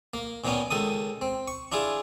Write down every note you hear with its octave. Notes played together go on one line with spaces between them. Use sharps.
A#3
A#2 D#3 A#3 B3 C#4
C#2 D#3 A4 D#6
C4
C#6
D4 E4 F4 G#4